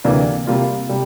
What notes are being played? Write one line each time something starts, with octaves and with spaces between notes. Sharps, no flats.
D2 C3 E3 A#3 D4
C3 G3 A#3 F4
C3 G3